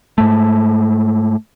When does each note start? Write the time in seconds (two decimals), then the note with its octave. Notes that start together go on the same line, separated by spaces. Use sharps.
0.18 G#2 A3